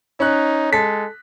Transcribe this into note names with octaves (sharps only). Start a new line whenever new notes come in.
C#4 D#4 F#6
G#3 A4 B6